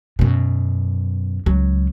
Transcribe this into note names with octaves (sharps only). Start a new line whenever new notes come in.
F#2 B2
C#2 F#3